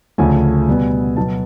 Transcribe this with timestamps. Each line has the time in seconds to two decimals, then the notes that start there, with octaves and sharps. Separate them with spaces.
0.18 D2 C#3 F3 A3 C#4 G#5
0.68 B2 G3 B3
1.17 B2 F#3 B3 A5